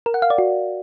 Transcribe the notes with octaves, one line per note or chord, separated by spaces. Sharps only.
A#4
F#5
F5
D5
F#4